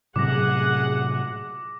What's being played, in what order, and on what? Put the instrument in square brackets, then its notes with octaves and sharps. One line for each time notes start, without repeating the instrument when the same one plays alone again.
[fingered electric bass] A2 C3 F#3 [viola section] G#4 F#5 [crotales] D6 A#6